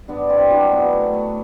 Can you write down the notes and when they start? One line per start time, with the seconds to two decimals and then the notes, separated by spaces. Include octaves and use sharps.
0.08 G2 B3 D4
0.29 G2 C4 E4
0.51 F#3 D4 F#4
0.72 B2 B3
0.92 A3
1.13 A3